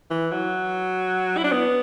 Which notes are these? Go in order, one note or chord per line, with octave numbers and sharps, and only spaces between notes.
E3
F#3
E4
D4
B3